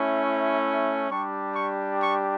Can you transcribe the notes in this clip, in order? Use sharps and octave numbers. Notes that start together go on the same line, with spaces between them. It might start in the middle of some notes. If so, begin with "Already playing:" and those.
Already playing: A3 C#4 E4
G3 D4 G4 C#6
C#6
C#6